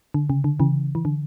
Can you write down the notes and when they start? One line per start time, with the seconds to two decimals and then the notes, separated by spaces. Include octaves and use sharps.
0.14 D3
0.30 C#3
0.44 D3
0.60 C#3 E3
0.95 E3
1.05 D3